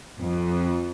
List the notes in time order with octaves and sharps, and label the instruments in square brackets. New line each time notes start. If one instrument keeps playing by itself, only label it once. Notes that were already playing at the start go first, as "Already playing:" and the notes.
[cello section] F2